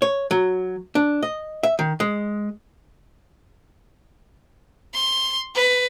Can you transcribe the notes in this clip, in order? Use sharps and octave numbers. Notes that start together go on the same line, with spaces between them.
C#5
F#3
D4
D#5
E5
D#3
G#3
C6
B4